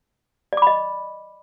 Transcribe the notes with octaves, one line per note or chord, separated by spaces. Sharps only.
D5 D#5 B5 D6